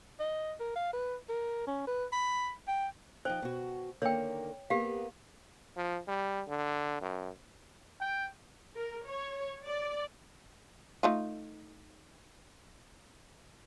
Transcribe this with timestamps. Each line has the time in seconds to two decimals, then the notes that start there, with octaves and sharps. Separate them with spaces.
0.20 D#5
0.60 A#4
0.76 F5
0.93 B4
1.29 A#4
1.67 C#4
1.87 B4
2.13 B5
2.68 G5
3.25 F3 D#4 C5 G5
3.42 B2 F#4
4.02 D3 D#3 A#3 C#5 G5
4.70 A#3 B3 G4 F5
5.77 F3
6.08 G3
6.48 D3
7.02 F#2
8.01 G5
8.75 A#4
9.07 C#5
9.65 D5
11.03 A3 D#4 F4